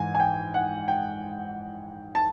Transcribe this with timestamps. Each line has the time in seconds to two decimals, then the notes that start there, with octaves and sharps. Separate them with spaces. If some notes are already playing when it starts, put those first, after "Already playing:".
Already playing: G#2 E3 G#5
0.15 G#5
0.20 G5
0.54 F#5
0.88 G5
2.15 A5